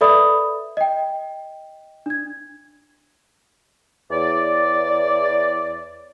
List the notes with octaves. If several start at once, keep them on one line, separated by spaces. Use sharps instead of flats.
A4 B4 D5 E5 B5 D#6
D#5 G5
D4 G#6
E2 C#5 D5